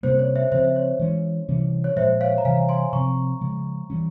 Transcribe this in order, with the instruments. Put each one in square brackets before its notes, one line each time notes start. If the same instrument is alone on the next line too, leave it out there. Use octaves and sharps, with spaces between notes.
[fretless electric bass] C3 G3 A#3 C#4 [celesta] C5
[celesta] C#5
C5 E5
[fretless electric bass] C#3 F3 C4 [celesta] C5 E5
[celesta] E5
C#5
[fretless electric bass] E3 G#3 C#4
C3 E3 G3 C#4
[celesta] C#5
[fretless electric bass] A#2 F3 G#3 [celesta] C5 E5
[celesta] C#5 F5
A#5
[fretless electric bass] C3 E3 G3 [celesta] F5 G#5
[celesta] G#5 C6
[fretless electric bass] C3 F3 C4 [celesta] A#5 C#6
[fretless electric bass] C#3 F3 G#3
E3 G3 C#4